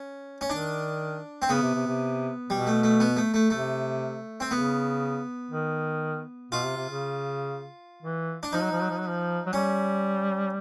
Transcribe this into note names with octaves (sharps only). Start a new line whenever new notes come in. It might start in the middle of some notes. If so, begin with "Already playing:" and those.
Already playing: C#4
C#4
D#3 D4
C4
C#3 B3
C3
C3
C3
B2 G3
A3
A3
B3
A3
A3
C3 A3
C4
C#3 B3
D#3
B2 F4
C3
C3
C#3
E3
D4
F3 D#4
F#3
F3
F#3
F3
F#3
F3
F#3
G3 C#4